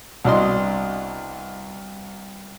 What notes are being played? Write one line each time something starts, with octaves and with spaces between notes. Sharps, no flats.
C2 B2 D4 D#5 C6